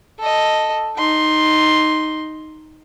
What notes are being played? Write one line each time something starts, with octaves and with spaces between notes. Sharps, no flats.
A4 D#5
D#4 C6